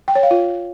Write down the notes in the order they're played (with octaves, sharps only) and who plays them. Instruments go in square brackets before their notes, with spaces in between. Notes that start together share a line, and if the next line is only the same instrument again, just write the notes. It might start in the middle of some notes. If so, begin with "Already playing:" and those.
[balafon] G5
C#5
F5
F4